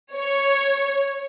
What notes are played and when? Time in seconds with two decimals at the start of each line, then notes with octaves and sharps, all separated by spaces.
0.15 C#5